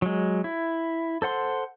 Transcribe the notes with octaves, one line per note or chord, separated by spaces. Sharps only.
F#3 G#3
E4
A4 C5 F#5 C6